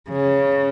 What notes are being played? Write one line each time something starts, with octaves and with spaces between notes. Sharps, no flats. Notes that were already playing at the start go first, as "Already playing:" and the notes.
C#3